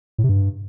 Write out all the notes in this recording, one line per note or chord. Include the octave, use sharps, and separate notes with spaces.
A2
C3
G2